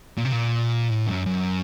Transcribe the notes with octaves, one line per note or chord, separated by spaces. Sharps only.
A#2
C3
A#2
A2
F#2
F#2